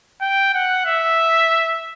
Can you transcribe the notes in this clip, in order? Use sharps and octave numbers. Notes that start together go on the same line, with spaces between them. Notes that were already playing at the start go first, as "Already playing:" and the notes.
G5
F#5
E5